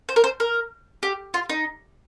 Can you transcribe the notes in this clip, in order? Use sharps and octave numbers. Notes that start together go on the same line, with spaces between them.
C5
A#4
C5
A#4
G4
F4
D#4